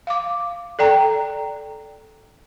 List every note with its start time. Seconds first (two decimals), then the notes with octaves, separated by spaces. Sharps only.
0.07 F5 D6
0.79 A4 D5 G5 A#5